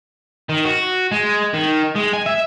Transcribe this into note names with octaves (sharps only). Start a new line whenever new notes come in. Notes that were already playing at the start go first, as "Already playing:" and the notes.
D#3
F#4
G#3
D#3
G#3
G#5
E5